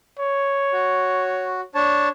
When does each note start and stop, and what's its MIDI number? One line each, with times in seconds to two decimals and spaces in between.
0.19 1.69 73
0.73 1.61 66
1.75 2.09 62
1.75 2.09 73
1.75 2.09 81